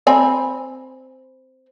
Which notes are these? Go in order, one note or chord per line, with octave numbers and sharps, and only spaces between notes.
C4 G#5 B5